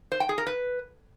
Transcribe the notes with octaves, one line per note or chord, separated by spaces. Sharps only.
C5
G5
G#4
A#4
B4